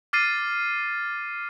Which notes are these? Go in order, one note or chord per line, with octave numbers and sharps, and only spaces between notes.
D6 F6 A6 C7 D#7